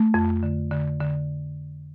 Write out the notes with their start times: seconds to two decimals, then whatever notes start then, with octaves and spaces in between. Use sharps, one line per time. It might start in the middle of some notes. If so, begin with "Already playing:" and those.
Already playing: A3
0.14 F2
0.43 D3
0.71 D3
1.00 D3